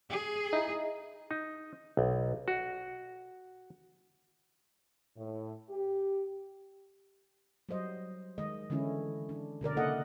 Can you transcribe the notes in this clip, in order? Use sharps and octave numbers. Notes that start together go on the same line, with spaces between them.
G#4
D#4 E4
D#4
B1
F#4
A2
G4
F#3 G3 C5 D#5
D#3 G#3 D#5
D3 E3 G#3 C#4 E4
D4
B2 D3 A#4 D5
C#3 A#3 E4 A4 D#5 F#5